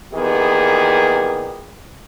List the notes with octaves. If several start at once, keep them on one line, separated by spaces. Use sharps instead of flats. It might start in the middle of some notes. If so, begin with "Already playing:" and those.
A#2 D#3 E3 B3 G4 G#4